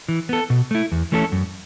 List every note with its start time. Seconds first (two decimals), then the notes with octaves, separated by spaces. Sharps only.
0.09 E3
0.29 B3 A4
0.50 B2
0.71 A3 E4
0.92 E2
1.12 E3 A3 C#4 A4
1.32 F#2